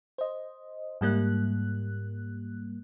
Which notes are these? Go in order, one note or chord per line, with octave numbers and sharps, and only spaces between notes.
C5 D#5
G#2 G3 A#3 F#6